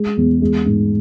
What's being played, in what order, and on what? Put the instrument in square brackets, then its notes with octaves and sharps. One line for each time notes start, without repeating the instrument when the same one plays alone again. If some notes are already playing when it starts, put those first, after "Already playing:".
Already playing: [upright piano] G#3
E2
G#3
G#2